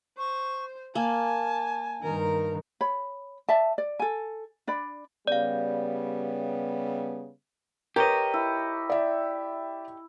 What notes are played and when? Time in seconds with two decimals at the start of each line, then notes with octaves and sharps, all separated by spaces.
0.18 C5 C#6
0.95 A#3 G#5 A5
2.03 G2 D#3 A#4
2.81 C#5 B5
3.49 D5 E5 A5
3.78 D5
3.99 A4 G#5
4.67 D4 D5 B5
5.27 C#3 G3 B3 D5 F5
7.96 G4 A#4 B4 C#5 D#5 D6
8.34 E4
8.90 D5 E5